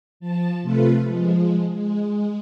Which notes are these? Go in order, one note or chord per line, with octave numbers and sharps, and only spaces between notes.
F3 A5
C3 A3 F4 A4 B4
F3 G#3
G#3